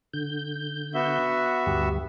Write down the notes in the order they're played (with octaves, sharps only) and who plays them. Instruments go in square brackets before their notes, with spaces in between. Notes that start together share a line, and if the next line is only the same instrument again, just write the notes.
[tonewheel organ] D3 G6
[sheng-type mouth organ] B3 F#4 E5
[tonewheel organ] D2 G2 G4